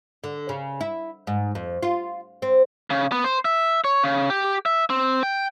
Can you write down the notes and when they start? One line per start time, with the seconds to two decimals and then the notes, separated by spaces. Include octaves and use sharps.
0.24 D3
0.49 C#3
0.81 E4
1.27 G#2
1.55 F2
1.83 F4
2.42 C4
2.90 C#3
3.12 B3
3.24 C5
3.45 E5
3.84 C#5
4.04 C#3
4.30 G4
4.66 E5
4.90 C4
5.23 G5